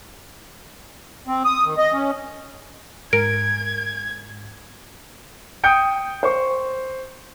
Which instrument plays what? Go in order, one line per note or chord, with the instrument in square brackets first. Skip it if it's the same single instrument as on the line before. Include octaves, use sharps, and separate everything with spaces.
[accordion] C4
D#6
D#3
D#5
C#4
[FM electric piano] G#2 [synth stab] A#4 [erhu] G#6 [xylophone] D7
[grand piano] G5 D#6 G6 C#7 D7
C5 C#6